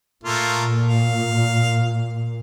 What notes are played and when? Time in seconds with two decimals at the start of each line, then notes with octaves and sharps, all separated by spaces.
0.24 A#2 A3 A#3 F4
0.88 F5